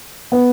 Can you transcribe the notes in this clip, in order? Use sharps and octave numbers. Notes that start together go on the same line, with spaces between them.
B3